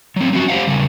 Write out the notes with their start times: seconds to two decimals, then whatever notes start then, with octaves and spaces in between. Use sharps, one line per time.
0.16 F#3 C4
0.33 C4 C#4 F#4
0.48 G4 C5 F5 F#5
0.67 C#3 G3